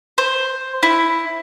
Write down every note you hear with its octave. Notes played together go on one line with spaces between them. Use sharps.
C5
E4